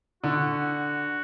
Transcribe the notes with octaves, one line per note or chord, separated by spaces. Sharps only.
D3 F#4